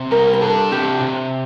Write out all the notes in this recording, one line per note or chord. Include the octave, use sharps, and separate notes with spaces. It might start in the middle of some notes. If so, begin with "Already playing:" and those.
Already playing: C3
G3 A#4
A#4
D4 A4
C3 G4
C3